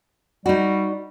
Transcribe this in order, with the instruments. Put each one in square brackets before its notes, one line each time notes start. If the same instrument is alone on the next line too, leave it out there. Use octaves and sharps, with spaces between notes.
[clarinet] G3 [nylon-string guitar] D#4 F#4